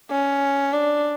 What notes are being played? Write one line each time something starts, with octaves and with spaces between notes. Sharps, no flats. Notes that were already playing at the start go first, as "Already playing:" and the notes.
C#4
D4